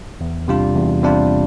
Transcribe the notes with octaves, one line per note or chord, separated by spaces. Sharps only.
E2
C3 G3 D4 F4
E2
C3 G3 D4 F4